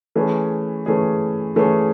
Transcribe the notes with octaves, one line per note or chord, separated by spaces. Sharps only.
E3 A3 C#4 G#4
E3 A3 C#4 G#4
E3 A3 C#4 G#4